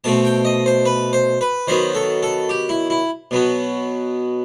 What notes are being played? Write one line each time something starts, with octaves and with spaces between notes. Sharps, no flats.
B2 A3 C4 A5
G5
D#5
C5
B4
C5
B4
D#3 F#3 B3 C5
A4
A4
G4
E4
E4
B2 F#3 B3